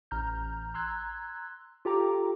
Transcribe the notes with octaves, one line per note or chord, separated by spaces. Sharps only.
A1 A#5 F6 G6
A#5 C6 E6 F#6 G#6
F4 G4 A4 G5 A#5 D6